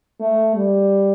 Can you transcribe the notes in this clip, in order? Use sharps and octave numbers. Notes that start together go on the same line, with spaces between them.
A3
G3